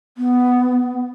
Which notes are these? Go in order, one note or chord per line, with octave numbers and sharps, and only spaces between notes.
B3